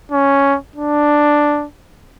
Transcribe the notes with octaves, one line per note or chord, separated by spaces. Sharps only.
C#4
D4